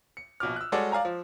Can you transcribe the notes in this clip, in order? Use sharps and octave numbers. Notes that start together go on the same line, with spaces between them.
C#7
A#1 B2 D6 F6
E6 F#6
G3 G#3 F#4 A4 C#5 D5
D5 F5 G#5 A#5
F3